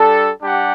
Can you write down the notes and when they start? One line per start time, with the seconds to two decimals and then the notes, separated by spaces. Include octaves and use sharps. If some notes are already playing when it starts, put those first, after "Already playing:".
Already playing: G3 D4 A4
0.42 G3 D4 G4 F#5